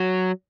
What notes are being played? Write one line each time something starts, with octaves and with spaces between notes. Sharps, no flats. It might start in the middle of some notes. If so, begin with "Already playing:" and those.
Already playing: F#3